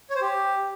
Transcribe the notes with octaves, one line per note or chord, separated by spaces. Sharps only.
C#5
C5
G4